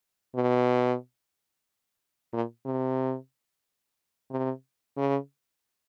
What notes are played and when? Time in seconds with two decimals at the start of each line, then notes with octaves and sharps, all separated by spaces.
0.36 B2
2.33 A#2
2.66 C3
4.31 C3
4.97 C#3